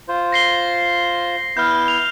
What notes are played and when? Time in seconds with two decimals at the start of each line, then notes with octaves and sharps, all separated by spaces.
0.08 F4 C5
0.33 A#6 C7 G7
1.57 B3 E4 F6 G6
1.88 F7